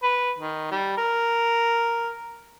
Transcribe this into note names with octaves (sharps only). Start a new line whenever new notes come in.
B4
D#3
G3
A#4